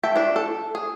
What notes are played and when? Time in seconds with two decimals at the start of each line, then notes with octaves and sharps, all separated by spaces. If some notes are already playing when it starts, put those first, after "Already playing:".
0.03 A4 E5 G5
0.16 D4 E4
0.36 A4
0.75 G#4